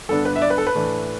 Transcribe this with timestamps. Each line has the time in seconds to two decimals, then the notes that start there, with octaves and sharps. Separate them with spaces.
0.09 G2 D3 B3 D4 A4
0.25 B4
0.36 E5
0.42 D5
0.50 B4
0.58 A4
0.67 B4
0.75 A2 E3 A3 D4